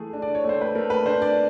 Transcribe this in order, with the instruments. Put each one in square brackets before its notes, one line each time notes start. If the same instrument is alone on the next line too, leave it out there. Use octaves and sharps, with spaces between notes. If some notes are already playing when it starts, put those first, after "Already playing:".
Already playing: [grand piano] E3 A3 G#4
D4
D5
C#5
A3
C5
B4
A3 A#4
B4
D4 C5
D5